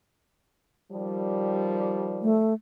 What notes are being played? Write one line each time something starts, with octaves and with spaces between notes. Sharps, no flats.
D#3 F3 G3
A3